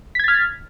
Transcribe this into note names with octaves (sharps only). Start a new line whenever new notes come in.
F6 G#6 A6 B6